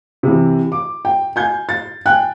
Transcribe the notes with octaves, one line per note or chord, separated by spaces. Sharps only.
C3 E3
D6
G5
G#5 G6 G#6
A6
G5 G#5 F#6